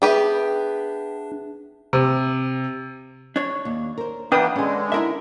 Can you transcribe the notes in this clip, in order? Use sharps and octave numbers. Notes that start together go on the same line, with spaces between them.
B3 D4 G4 G#4 B4 E5
C3
D4 C#5
D#2
A#4 C5
E3 A#3 B3 D4 B4 D#5 G5 D#6
D3 G#3 C#4 G#5
D#4 E4 A#4 E5